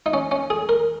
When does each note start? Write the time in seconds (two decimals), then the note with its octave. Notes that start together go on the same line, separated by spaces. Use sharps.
0.06 D#4
0.14 C#4
0.31 C#4
0.50 G#4
0.69 A#4